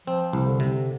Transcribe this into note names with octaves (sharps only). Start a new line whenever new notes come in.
F3 C4
C2
D3
C3